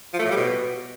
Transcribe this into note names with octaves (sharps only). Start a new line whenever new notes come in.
F3
A3
A2
G3
B2